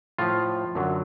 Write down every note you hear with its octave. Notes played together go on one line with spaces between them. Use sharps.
A2 F3 F4
F#2 D3 F#3